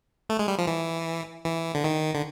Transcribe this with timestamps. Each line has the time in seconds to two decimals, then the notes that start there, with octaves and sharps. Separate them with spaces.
0.30 A3
0.39 G#3
0.48 G3
0.58 F3
0.67 E3
1.45 E3
1.75 D3
1.84 D#3
2.15 D3